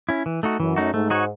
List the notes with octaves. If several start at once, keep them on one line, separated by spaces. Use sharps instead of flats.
C#4 E4
E3
A3 D#4 F#4
F#2 E3
A3 D#4 F#4
G#2 A3
D#4 F#4 C#5